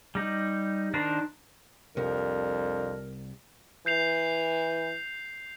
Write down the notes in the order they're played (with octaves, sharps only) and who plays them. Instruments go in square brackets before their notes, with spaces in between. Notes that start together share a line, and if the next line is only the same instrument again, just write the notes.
[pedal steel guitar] G3 D#4
D#3 D4 A#4 C5
[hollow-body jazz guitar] C2 [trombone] F2 [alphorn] D4 [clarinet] A#4
[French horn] E3 [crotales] G6 C7 F7